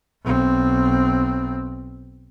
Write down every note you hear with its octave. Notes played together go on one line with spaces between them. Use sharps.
B1 C4